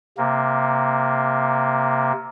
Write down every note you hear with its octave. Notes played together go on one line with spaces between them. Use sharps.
C3 A#3